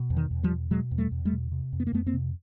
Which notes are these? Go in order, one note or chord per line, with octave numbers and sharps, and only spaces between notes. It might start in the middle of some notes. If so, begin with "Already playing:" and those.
Already playing: B2
E2
D#3
E2
F3 G3
B2
B2 F#3 G#3
E2
G3 A3
E2
G3 A3
B2
C3
F2
B3
A#3
F2 A3 B3
A#3 C4
C3